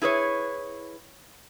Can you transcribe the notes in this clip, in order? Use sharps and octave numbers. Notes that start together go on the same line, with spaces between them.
E4 G#4 B4 C#5